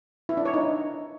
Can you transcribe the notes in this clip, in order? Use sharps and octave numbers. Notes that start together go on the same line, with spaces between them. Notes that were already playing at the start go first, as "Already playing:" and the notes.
E4
D4
C#5
D#4